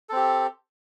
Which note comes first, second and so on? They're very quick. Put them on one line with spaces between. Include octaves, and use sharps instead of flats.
A4 C4 G4